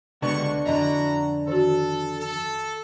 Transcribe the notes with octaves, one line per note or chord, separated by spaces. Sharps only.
C#2 D3 G3 B3 D4 F#4 C#6
F2 D3 E4 F#4 D#5 A#5
D#3 F#4 A4
A4